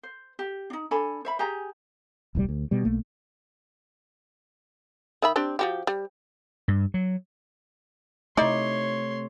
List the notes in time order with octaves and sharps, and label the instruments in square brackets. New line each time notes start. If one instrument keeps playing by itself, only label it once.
[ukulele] C5
G4
D4 D#4
D4 A4 G#5 B5
C5 E5 B5
G4 G#4 G#5 A#5
[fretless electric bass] D#1 C2 C#3 G3
D2
B2 G3
B1 A3 A#3
[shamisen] D#3 E5 B5
C4 D4 G4
F3 F#4 G4
G3
[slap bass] G2
F#3
[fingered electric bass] C3 A3 [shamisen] D#4 E4 D5 [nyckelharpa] C#5 C6